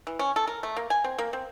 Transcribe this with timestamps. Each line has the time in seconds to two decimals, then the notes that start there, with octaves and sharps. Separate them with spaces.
0.07 E3
0.19 C#4
0.36 A4
0.47 A#4
0.63 A3
0.77 A#3
0.90 G#5
1.04 C4
1.19 A#3
1.33 C4